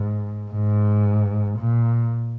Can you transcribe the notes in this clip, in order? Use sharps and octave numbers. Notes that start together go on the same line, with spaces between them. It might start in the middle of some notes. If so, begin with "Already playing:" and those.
Already playing: G#2
G#2
A#2